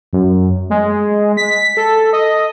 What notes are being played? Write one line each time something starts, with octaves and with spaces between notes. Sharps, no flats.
F#2
G#3
B6
A4
D#5